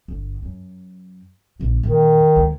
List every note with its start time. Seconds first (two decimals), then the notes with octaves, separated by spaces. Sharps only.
0.08 G1
0.42 F#2
1.60 A#1 D3
1.83 E2 A#2 D#3
2.36 D2 G#3